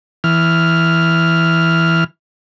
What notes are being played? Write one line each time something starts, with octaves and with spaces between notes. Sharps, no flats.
E3 F6